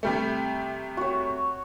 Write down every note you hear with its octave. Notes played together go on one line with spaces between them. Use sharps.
C3 G3 A3
F#4 C#5